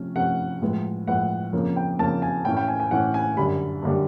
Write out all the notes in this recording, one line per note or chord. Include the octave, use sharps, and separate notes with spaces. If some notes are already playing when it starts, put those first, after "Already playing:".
Already playing: C3 F3 A3 C#4
C3 F3 A3 C#4 F#5
A2 F3 G#3 B3
A2 F3 G#3 B3 F#5
F2 C#3 F3 A#3 C#4
G5
F2 C#3 F3 A#3 C#4 A5
G#5
A2 E3 A3 C#4 G5
G5
G#5
G#5
A2 E3 A3 C#4 F#5
G#5
F#2 D3 G3 B5
F#2 D3 G3